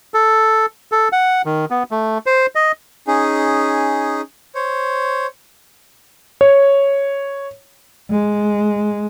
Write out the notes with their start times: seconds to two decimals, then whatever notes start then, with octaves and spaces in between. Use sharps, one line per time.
0.14 A4
0.92 A4
1.12 F#5
1.45 D#3
1.70 B3
1.91 A3
2.26 C5
2.55 D#5
3.07 C#4 D#4 G#4
4.55 C5 C#5
6.41 C#5
8.10 G#3